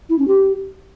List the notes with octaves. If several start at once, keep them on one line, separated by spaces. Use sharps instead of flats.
E4
C#4
G4